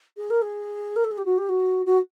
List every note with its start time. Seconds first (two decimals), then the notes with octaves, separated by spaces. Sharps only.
0.17 G#4
0.30 A#4
0.42 G#4
0.96 A#4
1.04 A4
1.11 G#4
1.17 G4
1.25 F#4
1.38 G4
1.49 F#4
1.85 F#4